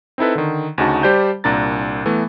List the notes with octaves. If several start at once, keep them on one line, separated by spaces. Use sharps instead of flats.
C4 D#4 E4 A4 B4
D3 D#3
D2 C#3 D#4 F#4 A5
G3 G4 C5 D5 A5 G6
C2 A#2 D4 A#5 A6
E3 A3 B3